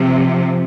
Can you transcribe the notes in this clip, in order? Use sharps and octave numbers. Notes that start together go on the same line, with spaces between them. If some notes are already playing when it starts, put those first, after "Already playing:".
Already playing: C3 F3 C4